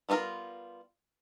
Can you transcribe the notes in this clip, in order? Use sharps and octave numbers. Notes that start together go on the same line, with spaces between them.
G3 B3 D4 F4 A#4